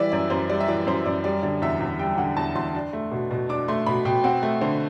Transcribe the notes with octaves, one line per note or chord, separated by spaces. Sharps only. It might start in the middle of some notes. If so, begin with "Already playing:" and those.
Already playing: E3 G3 D5 E5
F#2 D5
F#2 C5
G3 D5
E5
E3 D5
F#2 C5
F#2 D5
G3 D5
D3 D5
E2 E5
E2
G3 G5
D3 F#5
E2 A5
E2 C6
D4
A3
B2
B2
D4 D6
A3 C6
B2 B5
B2 G5
C4 F#5
A3
D3 C5